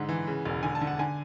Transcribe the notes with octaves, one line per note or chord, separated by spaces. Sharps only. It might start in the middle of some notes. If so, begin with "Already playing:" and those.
Already playing: G#2 D3 F#5
E3
C#3
E1
D3 G#5
A5
D3
F#5
D3 G#5